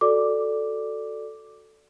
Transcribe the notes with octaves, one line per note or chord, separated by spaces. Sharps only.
F#4 A4 D5 D6